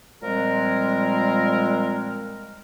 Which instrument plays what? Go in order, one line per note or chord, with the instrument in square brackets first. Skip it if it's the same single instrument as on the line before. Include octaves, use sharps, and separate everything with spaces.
[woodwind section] A#2 F3 G3 G#3 C4 A#4